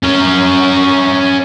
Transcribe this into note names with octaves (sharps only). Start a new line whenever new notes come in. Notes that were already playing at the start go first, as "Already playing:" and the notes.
C#4 A#4